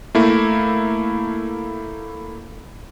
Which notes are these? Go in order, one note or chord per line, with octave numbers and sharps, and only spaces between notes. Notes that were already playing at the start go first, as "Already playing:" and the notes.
A3 A#3 E4